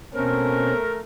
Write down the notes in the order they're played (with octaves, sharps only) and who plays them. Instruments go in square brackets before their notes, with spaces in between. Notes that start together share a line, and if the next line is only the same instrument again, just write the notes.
[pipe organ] B2 C4 C#4 [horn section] A3 A#4